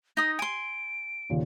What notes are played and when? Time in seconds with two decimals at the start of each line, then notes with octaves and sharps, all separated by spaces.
0.17 D#4 D#6 A#6
0.39 G#5 C6 D7
1.29 D#2 A#2 C#3